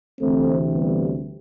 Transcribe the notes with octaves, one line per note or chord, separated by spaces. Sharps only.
D2 C3 E3 A3 C4
G3 B3